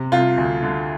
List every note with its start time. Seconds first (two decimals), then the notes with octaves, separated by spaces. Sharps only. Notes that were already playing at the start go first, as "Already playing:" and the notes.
Already playing: C3
0.12 C2 F4
0.37 D2
0.63 D3